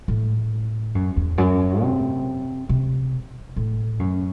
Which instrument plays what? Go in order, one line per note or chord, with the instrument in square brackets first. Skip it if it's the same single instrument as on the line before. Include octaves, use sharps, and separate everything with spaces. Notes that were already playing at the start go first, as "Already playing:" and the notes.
[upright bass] A2
F#2
E2
F#2
C3
C3
A2
F#2